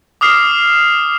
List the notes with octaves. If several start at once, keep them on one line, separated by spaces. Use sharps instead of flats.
D6 D#6 F6 C7